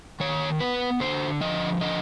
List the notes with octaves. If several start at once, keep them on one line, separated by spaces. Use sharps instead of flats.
D#3 C#5
B3 B4
D3 C5
F3 D#5
D3 D#5